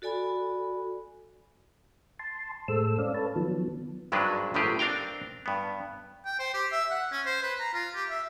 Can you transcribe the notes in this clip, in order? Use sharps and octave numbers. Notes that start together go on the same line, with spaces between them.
F#4 A4 D5 G#5 B5
A5 C6
A2 G#3 A4 C5 E6
C#4 D5 F5
A4 B4 C#5 A5
D#3 F3 F#3 B3
G#1 G2 F#3 G#3 D4 B4
G1 A2 F3 F#3 G4 G#4
C4 D4 A#4 F5 G5
G2 B3
G5
C5
G4
E5
F#5
C#4
C5
B4
A#5
F4
G4
E5